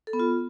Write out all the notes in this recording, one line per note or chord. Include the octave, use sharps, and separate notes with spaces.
A4
B3
F4